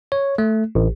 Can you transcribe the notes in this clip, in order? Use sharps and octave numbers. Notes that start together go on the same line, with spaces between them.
C#5
A3
A1